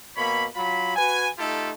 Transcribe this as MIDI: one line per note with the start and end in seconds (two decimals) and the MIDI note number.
0.17 0.46 47
0.17 0.46 58
0.17 0.46 73
0.17 0.46 83
0.55 0.95 54
0.55 0.95 65
0.55 0.95 83
0.96 1.29 66
0.96 1.29 71
0.96 1.29 80
1.38 1.71 57
1.38 1.71 63
1.38 1.71 65
1.38 1.71 67
1.38 1.71 69